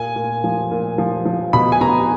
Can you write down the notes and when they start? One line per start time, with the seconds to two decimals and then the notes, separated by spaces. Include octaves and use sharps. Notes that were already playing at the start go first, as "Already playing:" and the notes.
Already playing: A#2 G#5
0.16 A#2
0.44 F3
0.71 A#2
0.98 F3
1.25 F3
1.53 B2 B5
1.72 G#5
1.81 B2 A#5